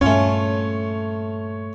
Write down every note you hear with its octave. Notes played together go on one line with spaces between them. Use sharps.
G2 A#2 A3 C#4 F4 C#5